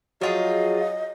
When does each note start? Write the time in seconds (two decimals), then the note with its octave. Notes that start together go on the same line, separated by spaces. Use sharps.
0.21 F3 F#3 F4 G#4 D#5